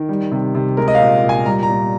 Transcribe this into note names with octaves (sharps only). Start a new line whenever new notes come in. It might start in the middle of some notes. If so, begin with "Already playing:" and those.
Already playing: D#3
G3
C3
C3
G#3 A#4
D#5
F5
A#2
A#2
G#5
G3 A#5
A#5
A#2